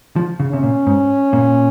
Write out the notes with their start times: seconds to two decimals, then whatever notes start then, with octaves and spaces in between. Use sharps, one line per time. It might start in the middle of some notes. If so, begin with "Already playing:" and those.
0.16 F3
0.40 C#3
0.52 C3 C#4
0.63 A#2
0.87 G#2
1.33 A#2